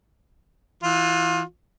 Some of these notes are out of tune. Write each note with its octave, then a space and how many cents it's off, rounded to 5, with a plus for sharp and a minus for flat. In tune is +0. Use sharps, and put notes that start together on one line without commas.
E3 +0 F4 +25